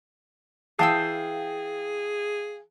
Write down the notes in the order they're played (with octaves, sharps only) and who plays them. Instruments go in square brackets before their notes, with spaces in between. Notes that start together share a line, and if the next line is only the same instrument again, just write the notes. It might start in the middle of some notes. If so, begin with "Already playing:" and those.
[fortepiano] E3 A5 D#6 [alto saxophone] G#4 [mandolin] F5 G5 E6